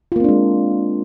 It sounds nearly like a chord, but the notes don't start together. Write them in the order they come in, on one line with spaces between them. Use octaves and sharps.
F4 A#3 C4 D4 G#3